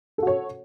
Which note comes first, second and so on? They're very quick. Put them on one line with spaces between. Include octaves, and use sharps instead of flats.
A4 F#4 C#5